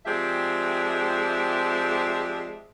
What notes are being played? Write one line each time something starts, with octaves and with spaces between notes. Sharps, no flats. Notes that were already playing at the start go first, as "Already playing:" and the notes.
F3 G#3 C4 G4 D5 E5